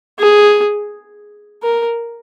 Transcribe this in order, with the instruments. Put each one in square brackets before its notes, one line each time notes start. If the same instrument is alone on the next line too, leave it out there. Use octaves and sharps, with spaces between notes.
[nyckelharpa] G#4
A#4